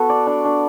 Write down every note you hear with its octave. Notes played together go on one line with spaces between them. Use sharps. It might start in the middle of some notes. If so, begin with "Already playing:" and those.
Already playing: B3 F#4 A4
D5
D4
D4